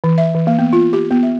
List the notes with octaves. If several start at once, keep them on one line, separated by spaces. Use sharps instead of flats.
E3
E5
E3
A#3
B3
F4
G4
B3
E5